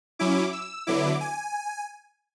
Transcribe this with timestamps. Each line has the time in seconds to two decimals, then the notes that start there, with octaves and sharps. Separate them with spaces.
0.19 F#3 C#4 E4 D6
0.53 E6
0.87 D3 F#3 B3 E4 D6
1.21 G#5